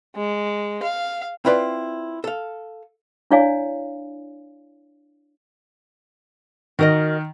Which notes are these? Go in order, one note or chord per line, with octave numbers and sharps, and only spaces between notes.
G#3
F5
C4 E4 F4 B4 D5
A4 F5
D4 E4 C#5 D5 F5 G#5
D#3 F#4 A#4 D#5